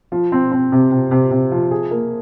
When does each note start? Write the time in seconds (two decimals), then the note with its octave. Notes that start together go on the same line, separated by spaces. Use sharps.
0.12 F3
0.32 C4
0.52 C4
0.72 C3
0.91 C3
1.11 C3
1.31 C3
1.52 F3
1.71 G#4
1.91 A#3